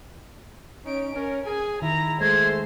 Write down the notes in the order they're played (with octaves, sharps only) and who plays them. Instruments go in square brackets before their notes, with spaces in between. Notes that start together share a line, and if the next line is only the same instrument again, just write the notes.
[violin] C#4 D7 [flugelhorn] D#4
[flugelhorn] C#4 [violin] A#4
[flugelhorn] G#4 [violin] G#5
[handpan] D#3 [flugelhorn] E4 [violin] A#5
[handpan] G#3 [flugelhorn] A3 [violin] C5 C6 [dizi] G#6